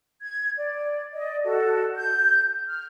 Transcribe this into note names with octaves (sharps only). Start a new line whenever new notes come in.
G#6
D5
D5 D#5
F#4 A4
G6
F6